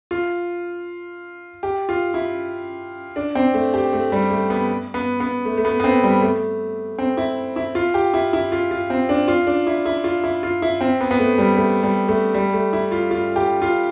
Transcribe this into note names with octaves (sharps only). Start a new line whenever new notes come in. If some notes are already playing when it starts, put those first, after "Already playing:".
F4
G4
F4
E4
D4
C4
A3
G4
A3
G3
A3
B3
B3
B3
A3
A3
B3
B3
C4
G3
A3
C4
E4
E4
F4
G4
E4
E4
F4
F4
C4
D4
F4
D4
E4
E4
F4
E4
F4
E4
C4
B3
B3
A3
G3
A3
G3
A3
G3
A3
E4
F4
F4
G4
F4